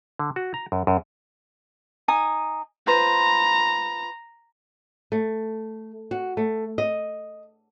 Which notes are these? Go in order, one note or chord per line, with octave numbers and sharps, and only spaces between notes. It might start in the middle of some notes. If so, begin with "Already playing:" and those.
D3
F#4
A#5
F#2
F#2
D#4 G#5 D#6
F4 B4 C5 A#5
A3
F#4
A3
D#5